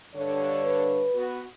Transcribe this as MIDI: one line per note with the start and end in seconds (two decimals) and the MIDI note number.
0.15 1.04 43
0.15 1.04 50
0.15 1.04 73
0.64 1.28 71
1.15 1.43 59
1.15 1.43 66